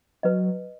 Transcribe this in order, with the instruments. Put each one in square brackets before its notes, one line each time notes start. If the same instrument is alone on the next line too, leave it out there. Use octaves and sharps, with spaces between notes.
[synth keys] F#3 [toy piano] B4 D#5